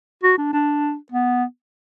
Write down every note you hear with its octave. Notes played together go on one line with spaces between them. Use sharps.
F#4
D4
D4
B3